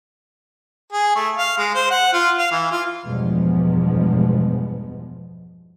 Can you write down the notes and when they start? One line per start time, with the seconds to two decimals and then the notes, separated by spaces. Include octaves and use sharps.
0.92 G#4
1.15 A3
1.38 F5
1.57 G#3
1.74 C5
1.90 F#5
2.13 F4
2.38 F5
2.51 E3
2.71 F4
3.05 E2 G2 B2 F3 G#3 B3